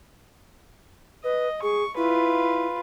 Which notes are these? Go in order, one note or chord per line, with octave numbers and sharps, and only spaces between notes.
B4 D#5
G#4 C#6
E4 F4 B4